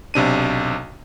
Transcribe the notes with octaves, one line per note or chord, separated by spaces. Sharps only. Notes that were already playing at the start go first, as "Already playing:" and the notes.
B1 C3 D4 D#7